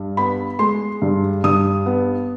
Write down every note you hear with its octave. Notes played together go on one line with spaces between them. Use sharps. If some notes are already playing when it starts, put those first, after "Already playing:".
Already playing: G2
B3 B5
G#3 C6
G2
G2 D#6
B3